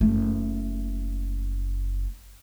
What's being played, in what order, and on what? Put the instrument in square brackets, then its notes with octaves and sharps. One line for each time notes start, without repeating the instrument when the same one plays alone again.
[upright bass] F#1 A3